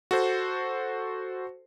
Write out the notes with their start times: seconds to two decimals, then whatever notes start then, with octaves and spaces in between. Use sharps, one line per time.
0.11 F#4 A4 C5